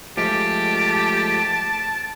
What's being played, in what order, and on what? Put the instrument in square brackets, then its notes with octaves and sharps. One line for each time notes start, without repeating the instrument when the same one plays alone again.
[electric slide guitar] F3 G#3 A3 [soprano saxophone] G4 [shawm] A5 [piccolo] D7